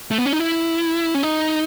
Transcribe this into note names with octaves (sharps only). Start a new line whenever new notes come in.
A3
B3
C#4
D#4
E4
C#4
D#4